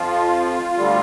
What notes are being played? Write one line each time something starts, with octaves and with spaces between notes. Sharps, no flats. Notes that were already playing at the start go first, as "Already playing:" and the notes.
Already playing: F2 F3 F4
D2 D3 G3